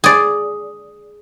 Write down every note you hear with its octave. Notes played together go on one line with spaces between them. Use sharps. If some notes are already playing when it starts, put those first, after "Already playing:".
G#4 D5